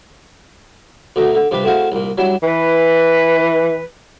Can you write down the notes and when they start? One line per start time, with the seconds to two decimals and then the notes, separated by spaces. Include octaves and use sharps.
1.16 D2 B2 D3 A3 A#5
1.35 D3
1.51 G2 C3 F3 G4 B4 B5
1.64 A3 C4 E4 F#4 G#4 F5
1.92 C2 A#2
2.18 F#3 G3 D4 E4
2.43 E3 B4